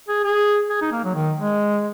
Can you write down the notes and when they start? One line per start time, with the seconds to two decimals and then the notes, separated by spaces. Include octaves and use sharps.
0.08 G#4
0.24 G#4
0.69 G#4
0.81 D#4
0.92 A#3
1.04 F#3
1.15 D#3
1.38 G#3